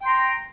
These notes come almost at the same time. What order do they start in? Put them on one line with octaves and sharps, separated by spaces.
G5 C6 A#5